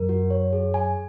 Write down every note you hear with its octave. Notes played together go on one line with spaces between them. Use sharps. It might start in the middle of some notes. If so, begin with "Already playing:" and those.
Already playing: F#2 A#4
F#4
C#5
G#4
G#5